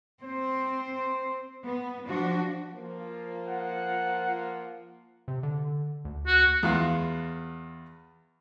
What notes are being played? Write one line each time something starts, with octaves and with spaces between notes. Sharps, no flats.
C4 C5
B3
F3 D4 F#4
F3 A#3 F4
F#5
C3
D3
D2
F#4
E2 F4 F5 F#6